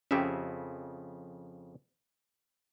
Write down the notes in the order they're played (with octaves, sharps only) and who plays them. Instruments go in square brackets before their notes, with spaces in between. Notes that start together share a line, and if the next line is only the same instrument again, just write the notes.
[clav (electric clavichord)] F2 C#3 E5 [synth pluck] C#4 G4